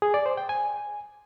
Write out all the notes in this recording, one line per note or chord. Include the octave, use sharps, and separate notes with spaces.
G#4
D5
C5
G5
G#5